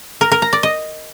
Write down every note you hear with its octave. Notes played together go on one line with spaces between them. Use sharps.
A#4
A#4
A#5
D5
D#5